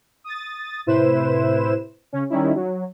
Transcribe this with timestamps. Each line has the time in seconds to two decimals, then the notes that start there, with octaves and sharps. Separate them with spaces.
0.24 D#6 A6
0.86 A2 C3 E4 B4 C5 E7
2.12 C#3 C#4
2.30 D#3 G3 C#4 D#4 E4
2.55 F#3